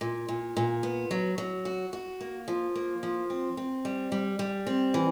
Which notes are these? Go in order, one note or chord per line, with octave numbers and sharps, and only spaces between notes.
A#2
A#2
A#2
B3
F#3
F#3
F#4
F#4
A#3
F3
A#3
F3
C4
C4
G3
G3
G3
C4
E3